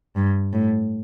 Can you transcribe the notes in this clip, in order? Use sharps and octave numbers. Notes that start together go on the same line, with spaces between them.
G2
A2